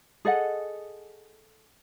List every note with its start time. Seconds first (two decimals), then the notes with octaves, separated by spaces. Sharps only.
0.25 G#4 A4 D#5 F#5